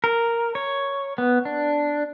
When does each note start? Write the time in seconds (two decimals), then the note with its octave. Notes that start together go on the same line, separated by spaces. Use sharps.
0.04 A#4
0.55 C#5
1.18 B3
1.45 D4